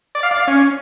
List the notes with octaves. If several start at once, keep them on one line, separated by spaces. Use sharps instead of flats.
D5
F5
D5
F5
C#4